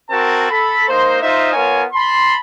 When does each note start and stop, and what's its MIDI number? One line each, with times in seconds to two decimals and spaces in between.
0.10 0.48 60
0.10 0.48 66
0.10 0.48 70
0.10 0.48 81
0.50 0.88 69
0.50 0.88 83
0.88 1.22 58
0.88 1.22 63
0.88 1.22 72
1.22 1.52 63
1.22 1.52 65
1.22 1.52 72
1.22 1.52 75
1.22 1.52 76
1.53 1.84 59
1.53 1.84 65
1.53 1.84 70
1.53 1.84 73
1.53 1.84 80
1.93 2.36 81
1.93 2.36 83
1.93 2.36 84